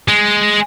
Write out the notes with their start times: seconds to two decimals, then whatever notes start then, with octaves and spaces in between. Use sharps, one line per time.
0.08 G#3